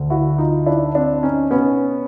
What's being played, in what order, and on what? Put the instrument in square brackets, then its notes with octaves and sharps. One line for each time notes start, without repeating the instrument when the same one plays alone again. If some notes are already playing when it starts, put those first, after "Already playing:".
Already playing: [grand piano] D2 D3
E4 F#4
D#4 F4
D4 E4
C4 D4
C#4 D#4
B2 B3 C#4